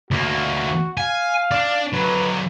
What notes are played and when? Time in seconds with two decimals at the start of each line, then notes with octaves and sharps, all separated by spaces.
0.11 D2 A#3 F#4
0.97 F5 G#5
1.51 D4 D5
1.93 D3 F#3 B4